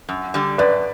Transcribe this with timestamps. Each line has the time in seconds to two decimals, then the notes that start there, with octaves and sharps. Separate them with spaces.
0.09 F#2
0.34 D3 G3
0.58 F#2 B4 D5